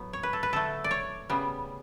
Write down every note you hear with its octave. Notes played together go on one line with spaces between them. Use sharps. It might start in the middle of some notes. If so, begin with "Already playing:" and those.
Already playing: A2 F#3 B3
C#5
B4
A4
B4
D3 A3 A4
D5
C#5
C#3 G3 B3